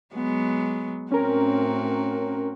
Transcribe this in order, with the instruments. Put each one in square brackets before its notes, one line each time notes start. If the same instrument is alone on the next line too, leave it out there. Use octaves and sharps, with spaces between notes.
[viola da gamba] F#3 G#3 B3
[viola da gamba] A2 C4 F#4 [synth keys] C#4 A#4